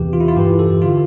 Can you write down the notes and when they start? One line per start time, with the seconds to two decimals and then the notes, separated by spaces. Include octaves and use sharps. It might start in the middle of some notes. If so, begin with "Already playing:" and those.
Already playing: E2 C3 E3 G4
0.13 F4
0.20 E4
0.28 F4
0.36 G2 E3 G4
0.59 A4
0.82 D3 F4